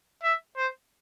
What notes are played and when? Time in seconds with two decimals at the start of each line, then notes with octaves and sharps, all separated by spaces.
0.23 E5
0.57 C5